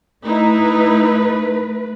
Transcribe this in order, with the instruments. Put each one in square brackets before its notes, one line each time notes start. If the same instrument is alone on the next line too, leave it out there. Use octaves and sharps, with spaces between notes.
[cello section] A3 B4 [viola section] D#4 E4